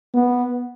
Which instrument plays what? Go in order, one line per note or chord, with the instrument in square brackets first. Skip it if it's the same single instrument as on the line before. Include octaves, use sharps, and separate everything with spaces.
[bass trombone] B3